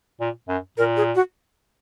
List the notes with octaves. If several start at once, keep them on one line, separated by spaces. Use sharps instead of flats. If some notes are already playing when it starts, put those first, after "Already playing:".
A#2
F#2
A#2 A#4
G#4
F#4